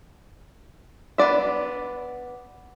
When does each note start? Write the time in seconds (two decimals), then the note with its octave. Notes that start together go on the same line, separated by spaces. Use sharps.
1.18 B3 D4 D5 E5